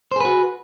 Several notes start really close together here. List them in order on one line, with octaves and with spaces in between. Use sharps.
C5 G#4 B4 F#4